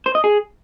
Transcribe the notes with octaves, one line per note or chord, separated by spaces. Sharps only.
C5
D#5
G#4